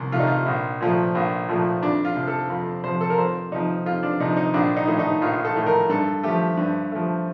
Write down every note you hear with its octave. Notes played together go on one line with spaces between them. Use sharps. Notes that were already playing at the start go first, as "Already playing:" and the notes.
Already playing: C2
C3 D#3 A3 F4
D#4
F4
A#1
A#2 F3 A3
A#1
A#2 F3 A3
F2 D4
F4
C3 F3
A4
F2
C3 F3 C5
A4
A#4
F2 C5
C3 F3 D#4
F2 F4
D4
C3 F3 D#4
D#4
A#1 D4
D#4
A2 A3
D#4
A#1 F4
A4
A2 A3
A#4
G2 A4
F3 A3 G4
G2
F3 A3